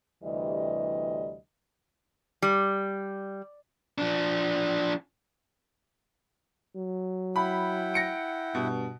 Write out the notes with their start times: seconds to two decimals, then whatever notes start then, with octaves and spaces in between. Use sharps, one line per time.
0.23 D2 C3 E3 G3 D#5
2.42 G3
3.98 F3 D4
6.76 F#3
7.36 E4 F#5 G5 B5
7.94 A#6 C#7 D7
8.55 G2 B2